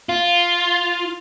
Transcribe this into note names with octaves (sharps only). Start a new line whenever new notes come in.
F4